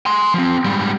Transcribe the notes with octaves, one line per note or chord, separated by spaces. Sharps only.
G#5 C6
F3 C4
G#2 G3